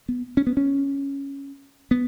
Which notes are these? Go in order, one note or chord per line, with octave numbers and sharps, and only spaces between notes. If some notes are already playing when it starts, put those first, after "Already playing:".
B3
C#4
B3
C#4
B3